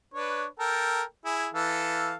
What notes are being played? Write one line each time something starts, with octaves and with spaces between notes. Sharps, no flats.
D4 B4 C#5
A4 A#4 G5
E4 G#4
E3 A4 F5